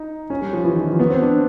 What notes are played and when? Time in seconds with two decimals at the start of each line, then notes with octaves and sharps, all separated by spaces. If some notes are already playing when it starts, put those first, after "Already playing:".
Already playing: D#4
0.30 C#4
0.41 G3
0.53 F3
0.64 E3
0.76 D#3
0.88 F3
0.99 B3
1.10 C4
1.22 D4